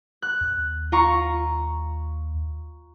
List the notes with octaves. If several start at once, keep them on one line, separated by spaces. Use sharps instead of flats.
F#6
D#2
F4 A#5 C#6